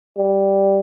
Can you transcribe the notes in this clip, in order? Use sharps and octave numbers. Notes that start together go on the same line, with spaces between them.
G3